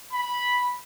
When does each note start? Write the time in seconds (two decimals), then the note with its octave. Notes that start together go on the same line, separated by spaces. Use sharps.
0.13 B5